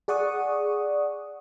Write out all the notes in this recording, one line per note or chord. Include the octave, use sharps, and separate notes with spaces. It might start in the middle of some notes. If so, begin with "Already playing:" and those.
G#4 D5 F#5 C#6 D#6